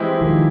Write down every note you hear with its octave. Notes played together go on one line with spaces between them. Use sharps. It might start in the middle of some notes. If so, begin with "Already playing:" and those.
Already playing: E3 G#3 C4 E4 G4
D#3 F3